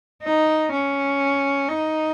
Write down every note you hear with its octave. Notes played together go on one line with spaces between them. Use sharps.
D#4
C#4
D#4